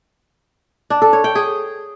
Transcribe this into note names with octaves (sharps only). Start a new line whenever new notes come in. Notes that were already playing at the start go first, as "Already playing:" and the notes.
D4
A4
C#5
G5
G#4